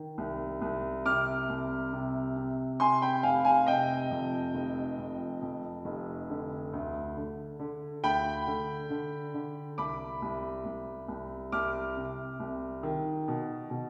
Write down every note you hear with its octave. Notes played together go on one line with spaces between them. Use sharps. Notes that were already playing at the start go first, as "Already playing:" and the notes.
Already playing: D#3
C2
C2
C3 D6 F6
C2
C3
C3
C3 G#5 C6
G5 B5
F1 F5 G#5
F5 G#5
C3 D#5 G5
F2
F1
F2
F2
F1
D3
D2
D3
D3
D2 G5 B5
D3
D3
D3
C2 B5 D6
C2
C2
C2
C2 D6 F6
C3
C2
D#3
B2
B2